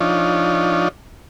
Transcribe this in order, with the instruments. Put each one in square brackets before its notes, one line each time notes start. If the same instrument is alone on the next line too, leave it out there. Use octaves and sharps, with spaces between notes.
[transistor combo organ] F3 D4 D#4 F4 C#5